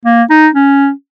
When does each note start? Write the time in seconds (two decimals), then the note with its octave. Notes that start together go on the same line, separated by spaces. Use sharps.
0.05 A#3
0.30 D#4
0.55 C#4